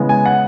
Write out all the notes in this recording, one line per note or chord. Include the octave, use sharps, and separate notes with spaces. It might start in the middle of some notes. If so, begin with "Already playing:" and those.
Already playing: C#3 E3 G#3 B3
G#5
F#5